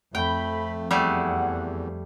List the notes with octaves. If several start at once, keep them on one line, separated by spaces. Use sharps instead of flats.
F2 A3 G5 B5
E2 G3 A3 G#4 F#5